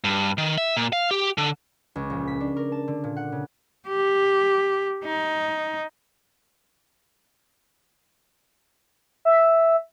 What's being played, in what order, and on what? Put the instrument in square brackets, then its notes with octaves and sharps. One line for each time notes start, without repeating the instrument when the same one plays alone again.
[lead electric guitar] G2
D#3
E5
A#2
F5
G4
D3
[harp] C#2
A#1
B6
D4
A#4
A5
D3
A#2
F#5
C#3
[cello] G4
D#4
[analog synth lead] E5